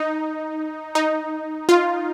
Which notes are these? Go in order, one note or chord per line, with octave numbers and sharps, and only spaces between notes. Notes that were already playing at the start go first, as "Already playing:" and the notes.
Already playing: D#4
D#4
F4